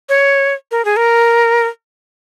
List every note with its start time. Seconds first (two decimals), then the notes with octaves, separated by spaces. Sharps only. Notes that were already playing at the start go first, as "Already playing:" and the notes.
0.09 C#5
0.71 A#4
0.85 G#4
0.97 A#4